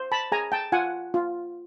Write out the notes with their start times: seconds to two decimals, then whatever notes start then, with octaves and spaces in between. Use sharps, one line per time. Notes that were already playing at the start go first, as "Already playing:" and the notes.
Already playing: C5
0.12 A5 B5
0.32 G#4 G#5 A#5
0.52 G5 A5
0.72 F4 F#5 G#5
1.14 F4